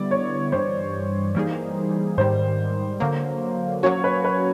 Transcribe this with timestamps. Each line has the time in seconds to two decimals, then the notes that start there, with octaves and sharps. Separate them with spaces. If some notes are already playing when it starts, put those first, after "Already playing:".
Already playing: D3 G3 B3 E4 D5
0.11 C#5
0.52 G2 E3 G3 C5
1.35 E3 G3 A#3 D#4 G#4
2.18 G#2 D#3 G3 C5
3.00 D3 F#3 A#3
3.83 F#3 A#3 C#4 F#4 C#5
4.04 B4
4.24 B4